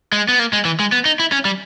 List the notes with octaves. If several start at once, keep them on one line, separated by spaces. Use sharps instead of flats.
G#3
B3
A#3
G#3
E3
G#3
B3
D#4
E4
C#4
G3